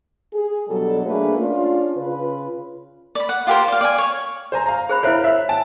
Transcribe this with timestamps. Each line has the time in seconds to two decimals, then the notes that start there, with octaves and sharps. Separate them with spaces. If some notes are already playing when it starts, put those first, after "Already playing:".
0.34 G#4
0.67 B2 F#3 G3 D4 A4
1.05 A3 A#3 D4 G#4 B4
1.37 C#4 D4 F4
1.96 C#3 F4 B4
3.15 D5 B5
3.29 F#5
3.47 F4 G4 A#4 C5
3.68 D5 F5
3.81 D5 F5 G5 G#5
3.98 C#5
4.52 C5 G#5 A#5
4.66 F5 A#5
4.89 G#4 C5 B5
5.03 E4 A#4 C5 C#5 E5 F5
5.24 E5 F#6
5.49 G#5 A5